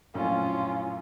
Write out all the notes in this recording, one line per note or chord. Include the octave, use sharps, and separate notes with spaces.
A#1 F#2 A2 C#4 F4